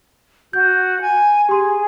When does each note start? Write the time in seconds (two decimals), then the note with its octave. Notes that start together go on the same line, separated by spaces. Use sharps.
0.53 F#4 G6
1.01 G#5
1.49 G4 G#4 C6